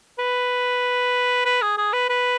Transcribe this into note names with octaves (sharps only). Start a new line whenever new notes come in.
B4
B4
G#4
G#4
B4
B4